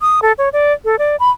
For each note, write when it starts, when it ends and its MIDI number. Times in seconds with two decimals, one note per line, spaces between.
0.01 0.20 87
0.22 0.32 69
0.38 0.49 73
0.53 0.73 74
0.85 0.98 69
0.99 1.16 74
1.20 1.31 83